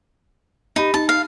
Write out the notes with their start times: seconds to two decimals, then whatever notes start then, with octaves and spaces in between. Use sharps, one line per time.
0.76 D#4 G4 B5
0.94 D#4 A5
1.09 F5